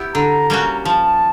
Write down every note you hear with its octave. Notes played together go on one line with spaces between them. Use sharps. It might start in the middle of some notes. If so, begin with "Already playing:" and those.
Already playing: B3 E4 G4
D3 A#5
G3 A#3 C#4 F#4
F3 A5